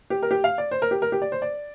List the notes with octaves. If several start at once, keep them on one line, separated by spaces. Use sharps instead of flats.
G4
A#4
G4
F5
D5
C5
A#4
G4
A#4
G4
D5
C5
D5